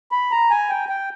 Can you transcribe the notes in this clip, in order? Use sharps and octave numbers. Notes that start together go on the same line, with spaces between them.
B5
A#5
G#5
G5
G5